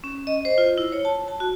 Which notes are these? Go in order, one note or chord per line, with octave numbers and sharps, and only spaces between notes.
C#4
D#5
C5
F4
E4
C#5
A5
A5
F#4